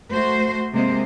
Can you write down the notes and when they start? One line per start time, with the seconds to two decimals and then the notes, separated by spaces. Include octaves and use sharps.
0.11 A3 F#4 C5
0.72 C3 G#3 A#3 C5